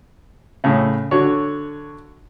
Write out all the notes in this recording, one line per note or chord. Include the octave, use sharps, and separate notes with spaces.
A2 C#3
D3 F#4 C#5